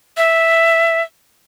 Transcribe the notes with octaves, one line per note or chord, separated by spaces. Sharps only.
E5